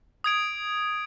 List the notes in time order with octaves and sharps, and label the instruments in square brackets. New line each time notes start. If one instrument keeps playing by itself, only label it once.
[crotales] D#6 G#6 D7